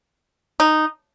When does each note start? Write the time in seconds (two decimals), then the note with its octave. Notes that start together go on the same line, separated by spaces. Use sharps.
0.60 D#4